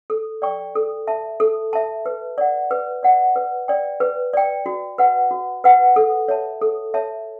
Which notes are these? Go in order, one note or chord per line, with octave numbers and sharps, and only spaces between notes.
A4
D5 G5 C#6
A4
E5 A5
A4
E5 A5
B4
D5 F#5
B4
D5 F#5
B4
D5 G5
B4
D5 G5
F#4
B4 F#5
F#4
B4 F#5
A4
C#5 E5 A5
A4
C#5 E5 A5